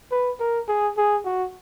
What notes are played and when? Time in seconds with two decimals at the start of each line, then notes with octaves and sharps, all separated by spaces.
0.12 B4
0.40 A#4
0.68 G#4
0.97 G#4
1.25 F#4